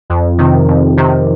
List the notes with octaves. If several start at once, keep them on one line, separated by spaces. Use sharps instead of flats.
F2
C3 D#3
F2
C3 D#3